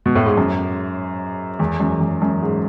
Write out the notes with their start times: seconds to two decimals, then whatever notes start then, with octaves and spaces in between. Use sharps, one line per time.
0.06 B2
0.16 A2
0.26 G#2
0.37 F#2
1.59 E2
1.80 F#2
2.00 E2
2.22 F#2
2.42 G#2